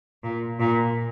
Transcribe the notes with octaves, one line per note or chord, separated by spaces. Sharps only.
A#2
A#2